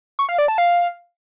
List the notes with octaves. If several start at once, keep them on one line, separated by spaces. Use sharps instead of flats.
C#6
F5
D5
A5
F5